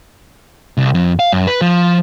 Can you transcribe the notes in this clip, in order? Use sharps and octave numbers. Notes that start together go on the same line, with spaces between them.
C2
F2
F5
F#2
B4
F3